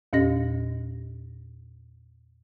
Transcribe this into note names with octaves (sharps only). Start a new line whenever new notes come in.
E2 A#2 C#4 G4 D#5 A#6